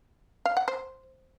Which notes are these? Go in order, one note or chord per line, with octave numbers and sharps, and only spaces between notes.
F5
F#5
C5